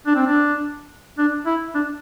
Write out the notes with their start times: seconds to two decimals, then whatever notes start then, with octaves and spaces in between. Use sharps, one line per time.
0.06 D4
0.16 C4
0.26 D4
1.18 D4
1.46 E4
1.74 D4